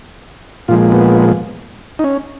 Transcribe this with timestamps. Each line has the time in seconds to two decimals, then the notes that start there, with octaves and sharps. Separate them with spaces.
0.68 A#2 F3 G#3 F4
0.92 B3
1.99 D#4
2.04 C#4